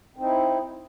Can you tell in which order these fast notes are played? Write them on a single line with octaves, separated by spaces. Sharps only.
C4 D#4 E4